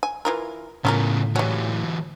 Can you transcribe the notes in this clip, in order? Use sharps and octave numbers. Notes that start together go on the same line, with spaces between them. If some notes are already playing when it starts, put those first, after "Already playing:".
G#5
E3 F4 A#4
A2 C#3 B3 C#4 F4 A#4
E3 F#3 G3 C#4